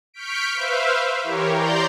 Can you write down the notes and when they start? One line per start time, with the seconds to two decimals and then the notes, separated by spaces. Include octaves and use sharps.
0.14 C#6 F6 G6 B6 D7
0.54 B4 C5 E5 F5
1.24 E3 G4 A#4 C#5
1.53 D5 A#5 C6 G6